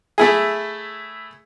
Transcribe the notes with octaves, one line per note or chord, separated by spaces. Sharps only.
A3 E4 G#4